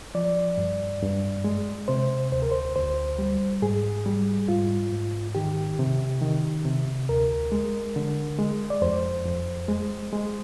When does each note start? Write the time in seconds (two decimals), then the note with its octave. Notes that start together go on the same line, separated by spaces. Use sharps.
0.15 F3 D5
0.58 G2
1.02 G2
1.44 G#3
1.88 C3 C5
2.32 D2 C5
2.42 A#4
2.52 C5
2.75 D2 C5
3.19 G3
3.62 G#2 G#4
4.06 G3
4.48 G#2 F4
4.92 G#2
5.35 D#3 G4
5.79 C3
6.22 D#3
6.65 C3
7.09 D2 A#4
7.52 G#3
7.96 D3
8.39 G#3
8.70 D5
8.82 F2 C5
9.26 F2
9.68 G#3
10.13 G#3